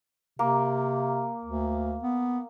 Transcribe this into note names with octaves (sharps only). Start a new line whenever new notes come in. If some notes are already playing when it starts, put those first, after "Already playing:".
C3 A#3
D2
B3